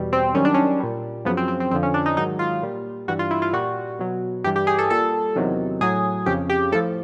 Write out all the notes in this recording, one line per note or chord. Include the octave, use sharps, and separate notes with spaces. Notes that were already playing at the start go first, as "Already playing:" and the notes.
Already playing: E2 B2 G3
C4
F#2 D#3 G3 C#4
D4
C#4
A#2 G3
F#2 C#3 F3 B3
C4
C4
C4
F2 D3 F3 C4
C#4
D4
D#4
G#2 D#3 F#3 D#4
F4
A#2 G3
G2 E3 G3 F#4
F4
E4
F4
A#2 G3 F#4
B2 F#3
G2 E3 G3 G4
G4
G#4
A4
A#2 G3 A4
E2 C3 D#3 F#3
A2 F#3 G#4
F2 C#3 F3 G4
G4
A2 F3 A4